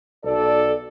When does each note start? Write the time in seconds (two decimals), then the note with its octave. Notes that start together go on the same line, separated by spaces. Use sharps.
0.25 B1 A4 D5